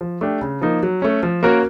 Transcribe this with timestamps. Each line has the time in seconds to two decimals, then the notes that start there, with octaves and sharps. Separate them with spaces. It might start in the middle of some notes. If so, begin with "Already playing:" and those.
0.01 F3
0.21 A3 D4 G4
0.41 C#3
0.61 F3 A#3 D#4
0.83 F#3
1.02 A3 C#4
1.23 F3
1.43 A#3 C#4 F#4 A#4